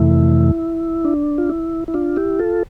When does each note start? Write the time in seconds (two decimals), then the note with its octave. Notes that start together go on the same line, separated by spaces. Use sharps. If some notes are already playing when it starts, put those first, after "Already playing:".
Already playing: F2 C3 E3 A3 E4
1.05 D4
1.38 F4
1.49 E4
1.88 E4
1.94 D4 F4
2.16 E4 G4
2.39 F4 A4